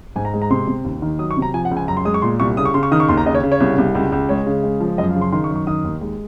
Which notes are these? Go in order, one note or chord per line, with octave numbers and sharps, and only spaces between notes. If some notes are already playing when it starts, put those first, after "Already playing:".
G#2 G#5
A#5
G#3
A#5
C3 C6
C3
D#2
D#3
F#3 D#6
C#6
C3
A#5
F3 G#5
F#5
C#2
G#5
F#2 A#5
C6
G#3 D#6
C#6
A#2 C6
C2 C#6
C#3 D#6
C#6
C#3 C6
C#6
D#3 D#6
C#6
D#2 C6
A#5
C#3 D#5
C#5
C#3
C#5
C2
C2
C#2
C#2
G#3 C#5
C#3
G#3
F3
F#2 D#5
F5
C#3
C6
D#3 C6
C#6
F#2
C#6
D#3 D#6
D#2
G#3